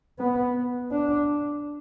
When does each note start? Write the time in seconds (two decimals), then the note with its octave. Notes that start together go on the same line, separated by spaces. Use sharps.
0.19 B3
0.91 D4